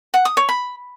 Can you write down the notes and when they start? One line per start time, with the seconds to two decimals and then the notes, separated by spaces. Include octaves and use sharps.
0.14 F#5
0.25 D#6
0.37 C#5
0.49 B5